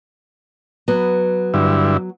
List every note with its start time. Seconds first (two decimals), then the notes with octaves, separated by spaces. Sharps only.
0.88 F#3 B3
1.54 G2 D3 E4